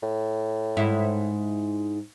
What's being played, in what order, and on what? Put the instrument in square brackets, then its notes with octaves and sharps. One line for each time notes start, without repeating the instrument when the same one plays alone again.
[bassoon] A2
[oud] G#2 E4